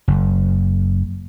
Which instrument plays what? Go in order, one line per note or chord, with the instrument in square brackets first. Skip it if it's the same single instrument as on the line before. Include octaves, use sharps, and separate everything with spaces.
[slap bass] F#1